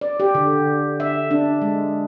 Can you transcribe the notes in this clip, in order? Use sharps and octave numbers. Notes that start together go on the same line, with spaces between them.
D5
G4
D3
E5
D4
G#3